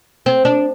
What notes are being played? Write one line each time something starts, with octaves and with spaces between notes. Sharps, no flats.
C4
D4